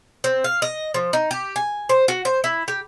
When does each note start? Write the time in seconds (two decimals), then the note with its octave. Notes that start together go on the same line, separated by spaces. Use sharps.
0.24 C4
0.44 F5
0.62 D#5
0.94 F3
1.13 D#4
1.31 G4
1.56 G#5
1.89 C5
2.08 F#4
2.25 C5
2.44 E4
2.68 G4